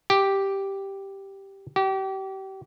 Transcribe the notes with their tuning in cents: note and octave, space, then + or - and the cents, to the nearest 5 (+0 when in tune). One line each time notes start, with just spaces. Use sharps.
G4 -5
G4 -35